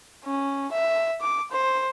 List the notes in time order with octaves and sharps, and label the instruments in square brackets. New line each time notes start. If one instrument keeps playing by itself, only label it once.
[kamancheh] C#4
E5
D6
C5